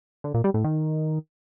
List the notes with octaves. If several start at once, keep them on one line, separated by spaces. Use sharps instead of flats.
D3
A#2
G3
A2
D#3